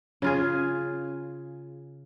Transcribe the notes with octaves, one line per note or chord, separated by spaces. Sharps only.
C#3 F4 G#4